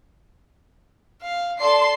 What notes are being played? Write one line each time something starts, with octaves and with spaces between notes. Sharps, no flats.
F5
A4 D5 A5 C6 C7